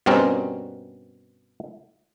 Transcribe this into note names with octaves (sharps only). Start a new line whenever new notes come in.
G2 B2 G3 C4 C#4 A#4